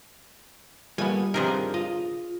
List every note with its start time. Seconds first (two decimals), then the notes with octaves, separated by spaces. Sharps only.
0.98 A#2 G3 A3 B3 G#5
1.34 G2 C3 D#3 F3 G#4 A#4
1.74 F4 D#5